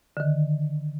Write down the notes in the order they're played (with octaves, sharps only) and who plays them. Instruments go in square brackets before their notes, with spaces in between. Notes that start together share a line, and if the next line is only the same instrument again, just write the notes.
[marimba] D3 D#3